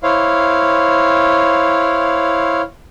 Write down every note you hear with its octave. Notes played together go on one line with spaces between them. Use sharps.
E4 C5 C#5 F5